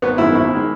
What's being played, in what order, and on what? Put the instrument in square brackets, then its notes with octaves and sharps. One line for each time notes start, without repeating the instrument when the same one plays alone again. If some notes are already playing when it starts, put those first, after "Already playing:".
[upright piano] G#1 [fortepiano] B3
[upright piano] F#2 D#3 G#3 [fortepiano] E4
[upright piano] G#1 [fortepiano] E4
[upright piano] D#3 G#3